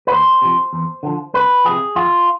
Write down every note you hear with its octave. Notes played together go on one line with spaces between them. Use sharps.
B4
D2 C5
C3 F3
E2
D3 F3
C2 B4
C3 F3 G#4
F2 F4